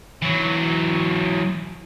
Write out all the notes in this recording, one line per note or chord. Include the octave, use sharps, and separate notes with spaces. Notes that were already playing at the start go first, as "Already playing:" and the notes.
E3 F#3